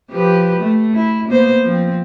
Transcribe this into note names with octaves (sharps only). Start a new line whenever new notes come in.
F3 G4 B4
A3
E4
A#3 B3 C5
F3 C4